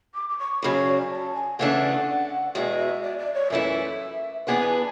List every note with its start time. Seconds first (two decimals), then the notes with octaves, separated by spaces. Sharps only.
0.14 D6
0.29 D6
0.39 C#6
0.62 F#2 C#3 F#3 B5
0.75 C#5
0.87 D5
0.99 G#5
1.11 A5
1.34 G#5
1.59 E2 C#3 E3 A3 D4 F#5
2.54 E2 B2 G#3 E5
2.78 E5
3.02 D5
3.19 D5
3.34 C#5
3.50 F#2 E3 A3 E4 E5
4.47 E3 B3 D4 G#4 B4 F#5
4.59 G#5
4.71 A5